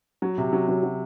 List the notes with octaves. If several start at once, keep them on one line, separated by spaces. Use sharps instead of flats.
F#3
C3
F#3
F#3
F#3